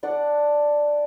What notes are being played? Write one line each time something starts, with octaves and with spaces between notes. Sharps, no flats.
D4 D5 F#5